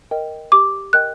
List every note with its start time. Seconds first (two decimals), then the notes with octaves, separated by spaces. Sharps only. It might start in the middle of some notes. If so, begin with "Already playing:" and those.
0.11 A#4 D#5 G5
0.52 G4 D6
0.93 A#4 D#5 G5 F#6